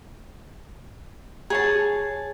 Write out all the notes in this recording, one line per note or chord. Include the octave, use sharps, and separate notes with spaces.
G#4 C#5 A5